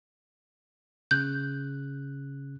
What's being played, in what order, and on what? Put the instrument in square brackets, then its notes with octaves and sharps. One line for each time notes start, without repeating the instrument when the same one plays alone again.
[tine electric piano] C#3 F#6 [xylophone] G6